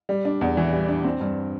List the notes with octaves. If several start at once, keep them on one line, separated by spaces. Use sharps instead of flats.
G3
D4
E2
E3
G3
D4
C4
G2